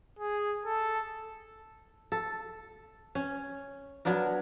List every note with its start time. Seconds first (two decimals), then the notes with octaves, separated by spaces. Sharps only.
0.19 G#4
0.66 A4
2.12 A4
3.15 C#4
4.05 F#3 B3 D4 A#4